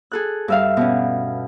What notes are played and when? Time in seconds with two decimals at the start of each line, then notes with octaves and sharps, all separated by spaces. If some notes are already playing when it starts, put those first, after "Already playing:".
0.12 G#4 A4 F#6
0.48 G2 E5 F5
0.77 B2 C#4